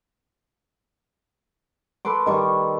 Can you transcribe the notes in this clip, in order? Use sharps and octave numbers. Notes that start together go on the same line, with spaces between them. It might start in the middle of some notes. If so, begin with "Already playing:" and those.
A4 B4 C6 D6
D#3 G3 C#6